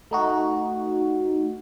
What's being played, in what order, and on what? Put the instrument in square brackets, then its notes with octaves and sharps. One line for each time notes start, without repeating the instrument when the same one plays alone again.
[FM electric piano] A3 D#4 F#4